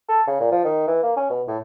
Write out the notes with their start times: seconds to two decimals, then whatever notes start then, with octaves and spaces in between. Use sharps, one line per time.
0.09 A4
0.27 C#3
0.40 A#2
0.51 F3
0.64 D#3
0.88 E3
1.03 A#3
1.17 C#4
1.30 B2
1.48 A2